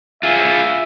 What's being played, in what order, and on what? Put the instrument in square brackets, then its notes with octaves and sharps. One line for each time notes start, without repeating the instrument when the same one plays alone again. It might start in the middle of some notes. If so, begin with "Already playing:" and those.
[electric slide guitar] F4 G#4 [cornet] E5